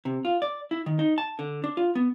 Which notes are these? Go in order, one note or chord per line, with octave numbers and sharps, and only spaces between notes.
C3
F4
D5
E4
D#3
D#4
A5
D3
D4
F4
B3